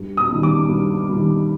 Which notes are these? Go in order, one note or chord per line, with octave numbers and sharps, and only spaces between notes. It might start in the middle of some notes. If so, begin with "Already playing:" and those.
Already playing: G2
D#6
D#3 G3
D6
G2
D#3 G3